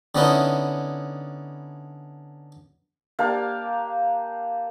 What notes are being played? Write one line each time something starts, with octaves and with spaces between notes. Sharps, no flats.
D3 B3 C#4 D#4 E4
A#3 D4 G4 F5